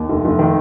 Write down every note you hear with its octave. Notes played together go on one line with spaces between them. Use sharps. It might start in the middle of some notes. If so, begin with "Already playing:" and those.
Already playing: D#2
F1
F1
D#3